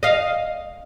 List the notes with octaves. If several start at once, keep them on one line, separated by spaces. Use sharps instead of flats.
D#5 F5